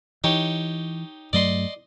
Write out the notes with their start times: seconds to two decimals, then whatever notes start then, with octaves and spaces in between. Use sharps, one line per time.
0.24 E3 D#4 G4 C#5
1.33 G2 F#3 A3 D5 D#5 C6